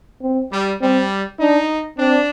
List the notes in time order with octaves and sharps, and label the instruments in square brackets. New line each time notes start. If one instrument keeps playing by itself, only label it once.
[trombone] C4
[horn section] G3
[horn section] G3 [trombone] C4
[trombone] D4 [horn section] D#4
[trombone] C4 [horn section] D4